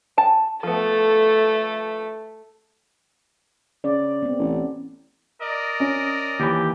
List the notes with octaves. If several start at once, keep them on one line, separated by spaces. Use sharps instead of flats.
G5 A5
F3 A3 B3 A4
C#3 D5
B3 C4
A1
A#4 D5 D#5
C#4
D#2 E3 G4